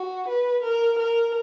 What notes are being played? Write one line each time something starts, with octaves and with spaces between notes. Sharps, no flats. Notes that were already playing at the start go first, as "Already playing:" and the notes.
Already playing: F#4
B4
A#4
A#4